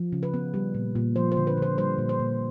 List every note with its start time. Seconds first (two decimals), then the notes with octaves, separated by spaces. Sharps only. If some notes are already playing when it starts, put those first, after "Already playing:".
Already playing: F3
0.12 C#3
0.23 B4
0.34 B3
0.54 G3
0.75 A#2
0.95 A#2
1.16 F3 C5
1.32 C5
1.37 D3
1.47 B4
1.57 D3 C5
1.78 G3 C5
1.98 A#2
2.09 C5
2.20 A#2